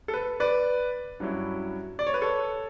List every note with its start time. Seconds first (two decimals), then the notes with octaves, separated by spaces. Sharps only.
0.08 A4
0.14 B4
0.40 B4 D5
1.20 G2 F#3 C#4 E4
1.99 D5
2.07 C#5
2.14 B4
2.22 A4 C#5